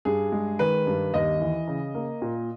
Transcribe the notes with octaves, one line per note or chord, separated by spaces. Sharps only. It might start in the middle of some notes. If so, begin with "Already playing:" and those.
G2 G#4
G#3
D#3 B4
G2
D#2 D#5
E3
C#3
A#3
A#2